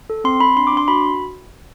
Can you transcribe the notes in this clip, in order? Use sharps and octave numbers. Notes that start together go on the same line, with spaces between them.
A4
C4 C6
C4 B5
D4 C6
D6
D4 C6
F#4 B5